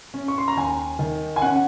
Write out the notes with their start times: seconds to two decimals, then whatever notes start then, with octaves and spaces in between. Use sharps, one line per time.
0.14 C#4
0.28 C#6
0.38 C6
0.48 A#5
0.57 D#2 G#5
0.99 D#3
1.36 G#5
1.42 C#4 F#5